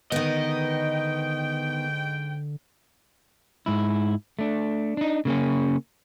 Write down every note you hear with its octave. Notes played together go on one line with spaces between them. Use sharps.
G#2 D3 D#3 B3 D#5 G5
G#2 E4
A3 D4
D4 D#4
C#3 A#3 C#4